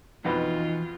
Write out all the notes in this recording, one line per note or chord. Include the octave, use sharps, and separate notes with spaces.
F2 B2 E3 D#4 F4 B4